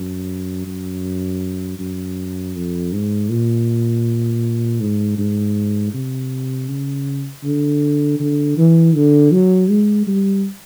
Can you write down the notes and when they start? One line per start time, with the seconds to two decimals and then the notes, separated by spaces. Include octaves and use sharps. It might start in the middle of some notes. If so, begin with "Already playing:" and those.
Already playing: F#2
0.66 F#2
1.79 F#2
2.55 F2
2.92 G#2
3.29 A#2
4.81 G#2
5.18 G#2
5.94 C3
6.69 C#3
7.44 D3
8.19 D3
8.57 E3
8.95 D3
9.32 F#3
9.70 G#3
10.07 G3